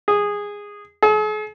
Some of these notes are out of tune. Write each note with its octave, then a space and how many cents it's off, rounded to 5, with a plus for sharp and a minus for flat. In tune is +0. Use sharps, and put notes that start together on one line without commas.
G#4 -15
G#4 +45